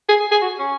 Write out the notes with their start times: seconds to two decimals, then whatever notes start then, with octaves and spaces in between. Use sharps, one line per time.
0.09 G#4
0.20 G#4
0.31 G#4
0.42 F#4
0.59 C#4